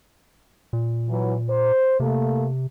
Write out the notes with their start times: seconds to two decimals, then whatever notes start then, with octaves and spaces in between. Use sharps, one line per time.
0.73 A#2
1.09 E3 F#3
1.49 C5
2.00 C3 A3 A#3